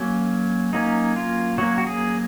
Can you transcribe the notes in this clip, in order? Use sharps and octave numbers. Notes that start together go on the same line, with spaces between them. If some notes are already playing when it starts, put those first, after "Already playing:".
Already playing: F#3 A#3 C#4
F#3 A#3 C#4 D#4
F4
F#3 A#3 C#4 F#4
F#4
G#4